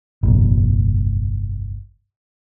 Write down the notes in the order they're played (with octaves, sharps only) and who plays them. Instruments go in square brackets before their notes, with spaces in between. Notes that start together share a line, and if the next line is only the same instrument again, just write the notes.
[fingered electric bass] G1 C2 F2 A#2